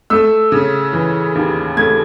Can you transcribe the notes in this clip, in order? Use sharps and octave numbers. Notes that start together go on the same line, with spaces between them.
A3 E6
C#3
E3
D#2
A3 G#6